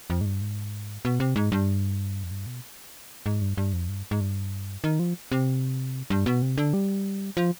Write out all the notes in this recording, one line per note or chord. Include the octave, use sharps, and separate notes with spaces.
F2
G#2
G2
G#2
B2
C3
G#2
G2
F2
G2
B2
G#2
G2
G2
F2
G2
G#2
G2
D#3
F3
C3
G2
B2
C3
D3
G3
F3